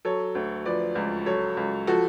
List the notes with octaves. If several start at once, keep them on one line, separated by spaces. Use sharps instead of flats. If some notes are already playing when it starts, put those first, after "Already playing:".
F#3 A4 C#5
D2
F3 B4 D5
C#2
F#3 A4 C#5
C#2
F3 F#4 A4